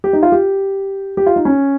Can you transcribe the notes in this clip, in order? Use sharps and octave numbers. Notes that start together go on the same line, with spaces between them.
G4
D#4
F4
G4
G4
F4
D#4
C#4